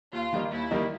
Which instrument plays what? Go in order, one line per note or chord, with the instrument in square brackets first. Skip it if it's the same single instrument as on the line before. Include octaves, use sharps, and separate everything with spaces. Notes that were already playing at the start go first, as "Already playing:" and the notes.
[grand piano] D#2 [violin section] F4
[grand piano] D#3 G3 A#3 D#4
[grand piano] D#2 [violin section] E4
[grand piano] D#3 G3 A#3 D#4